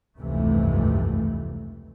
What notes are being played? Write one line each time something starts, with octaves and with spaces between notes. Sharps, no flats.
F1 C#2 G2 C3 E3 A3